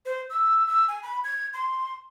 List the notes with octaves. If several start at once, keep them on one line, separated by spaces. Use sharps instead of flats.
C5
E6
E6
G#5
B5
G#6
C6